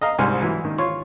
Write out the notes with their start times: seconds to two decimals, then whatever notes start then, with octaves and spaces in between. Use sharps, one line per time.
0.01 D#5 F5 A#5
0.18 C2 G#2 G3 G#5 F6
0.42 E3 F#3
0.65 D#3
0.78 F4 C#5